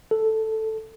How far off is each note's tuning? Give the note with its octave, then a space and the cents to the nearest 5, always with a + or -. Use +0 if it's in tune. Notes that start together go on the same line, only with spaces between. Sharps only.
A4 +0